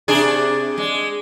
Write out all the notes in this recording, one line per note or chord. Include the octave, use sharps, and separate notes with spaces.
C3 D4 G#4
G#3